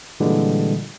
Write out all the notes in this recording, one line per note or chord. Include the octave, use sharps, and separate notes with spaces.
A#2 D3 E3 G3 G#3